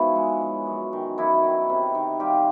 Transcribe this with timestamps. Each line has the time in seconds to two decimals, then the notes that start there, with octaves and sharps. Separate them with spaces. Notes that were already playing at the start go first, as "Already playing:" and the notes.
Already playing: G#2 F3 B3 C#4 E4 F#4
0.16 G#3
0.41 G#3
0.66 F#2
0.93 D#3
1.18 F#2 E4 F#4
1.44 D#3
1.69 C3
1.95 D#3
2.20 G3 F4 G4